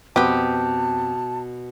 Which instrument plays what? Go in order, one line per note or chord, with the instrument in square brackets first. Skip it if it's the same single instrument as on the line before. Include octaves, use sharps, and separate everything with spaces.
[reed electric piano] F2 C4 F#6 [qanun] B2 [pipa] B3 G4 [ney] A5